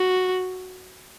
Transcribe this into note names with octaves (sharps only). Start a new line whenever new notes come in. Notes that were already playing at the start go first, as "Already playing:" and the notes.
Already playing: F#4